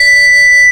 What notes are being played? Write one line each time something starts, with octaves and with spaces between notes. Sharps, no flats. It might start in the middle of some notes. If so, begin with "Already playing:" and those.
Already playing: B6